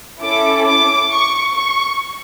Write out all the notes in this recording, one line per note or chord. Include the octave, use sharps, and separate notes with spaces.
C#4 E4 A4 D6
D6
C#6
C#6